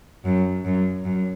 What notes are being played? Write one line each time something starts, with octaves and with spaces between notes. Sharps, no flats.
F#2
F#2
F#2